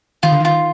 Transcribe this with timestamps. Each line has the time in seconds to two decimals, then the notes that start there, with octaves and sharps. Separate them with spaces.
0.23 D#3 F4
0.32 D3
0.40 D#3 F4